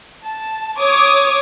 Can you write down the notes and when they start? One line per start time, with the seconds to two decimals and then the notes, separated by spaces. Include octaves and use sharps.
0.25 A5
0.80 C#5 D6 D#6 G#6